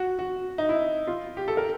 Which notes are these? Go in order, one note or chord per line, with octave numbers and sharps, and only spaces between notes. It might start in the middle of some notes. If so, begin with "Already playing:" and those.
Already playing: F#4
F#4
D#4
E4
F4
G4
A4
A#4